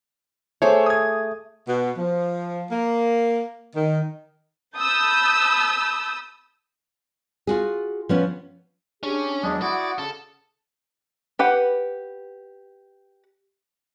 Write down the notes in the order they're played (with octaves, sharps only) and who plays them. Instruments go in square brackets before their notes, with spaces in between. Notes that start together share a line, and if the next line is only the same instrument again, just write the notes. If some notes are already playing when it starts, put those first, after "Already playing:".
[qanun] A3 G#4 D6 [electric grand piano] C5 C#5
[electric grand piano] D#6 G#6
[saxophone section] B2
F3
A#3
D#3
[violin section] A5 B5 D#6 E6 G6
[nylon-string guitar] F4 F#4 G#4
F3 B3 C#4
[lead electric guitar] C#4 [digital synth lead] D4 [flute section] G4 G#4
[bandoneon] E2 G#3 D4 [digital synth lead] F#3 [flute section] D#6
[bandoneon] E4 F#4 [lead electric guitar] D5 [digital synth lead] F#5
[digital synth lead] C#3 [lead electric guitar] A4
[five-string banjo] G4 B4 F#5